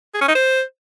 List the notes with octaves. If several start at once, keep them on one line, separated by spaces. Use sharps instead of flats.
G#4
C#4
D#4
C5